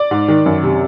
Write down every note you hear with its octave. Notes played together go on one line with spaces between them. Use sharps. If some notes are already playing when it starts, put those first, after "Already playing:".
Already playing: D5
G#2
D#3
F#2
C3